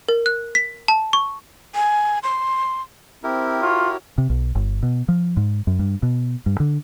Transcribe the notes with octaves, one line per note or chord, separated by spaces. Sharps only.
A#4
F#6
B6
A5
C#6
G#5
C6
C4 E4 G4 A#4
F4 F#4 C#5
C3
B1
G1
B2
F3
G#2
F#2
G2
B2
G2
D3